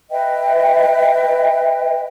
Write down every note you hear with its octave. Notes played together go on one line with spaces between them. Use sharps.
B4 D#5 E5 G5